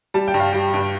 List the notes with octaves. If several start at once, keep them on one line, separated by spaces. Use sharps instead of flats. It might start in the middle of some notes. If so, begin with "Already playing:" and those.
G3 A5
G5
G2
F5
G3 G5
G2